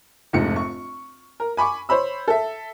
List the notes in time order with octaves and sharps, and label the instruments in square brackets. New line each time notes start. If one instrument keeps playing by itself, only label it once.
[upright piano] F1 A#1 G#2 C#7
C#6
A#4
G#5 B5 C#6 D6
C5 C#5 B5 E6
A4 E5